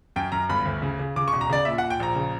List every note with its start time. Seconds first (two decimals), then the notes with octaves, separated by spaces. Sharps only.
0.16 F#2 G5
0.32 F#2 A#5
0.49 G1 B5
0.65 D2
0.82 C#3
0.99 C#3
1.16 C#3 D6
1.28 C#6
1.33 E1
1.41 A#5
1.49 C#3 D5
1.65 A#2 E5
1.78 A#2 F#5
1.90 G5
2.00 A#1 A#5
2.15 C#3